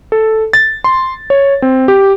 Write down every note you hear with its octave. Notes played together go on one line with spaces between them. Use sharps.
A4
A6
C6
C#5
C4
G4